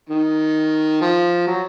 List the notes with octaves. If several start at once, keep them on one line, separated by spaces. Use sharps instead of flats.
D#3
F3
F#3